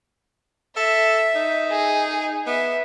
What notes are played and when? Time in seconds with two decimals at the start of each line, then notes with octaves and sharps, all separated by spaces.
0.76 A4 E5
1.35 D#4
1.71 G#4
2.47 B3 E5